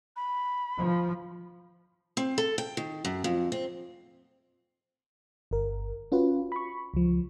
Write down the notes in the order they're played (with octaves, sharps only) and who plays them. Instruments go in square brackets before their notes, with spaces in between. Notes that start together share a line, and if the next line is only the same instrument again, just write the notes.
[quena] B5
[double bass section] F3
[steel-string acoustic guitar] C4
A4
G5
D#3
F#2
F2
C4
[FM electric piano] G1 A#4
C#4 F4 F#4 B4
B5 C#6
C#2 F3